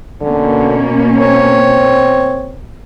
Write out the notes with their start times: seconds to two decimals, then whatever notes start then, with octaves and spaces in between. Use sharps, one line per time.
0.21 B2 D3 A#3 C#4
1.16 C4 C#5